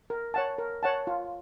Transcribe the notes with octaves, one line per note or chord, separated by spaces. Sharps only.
A#4
C#5 F#5 A5
A#4
C#5 F#5 A5
F4